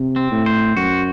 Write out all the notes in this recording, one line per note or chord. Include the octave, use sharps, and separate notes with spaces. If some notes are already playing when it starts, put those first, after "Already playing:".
Already playing: C3
C4
A2
C5
F#2 F#4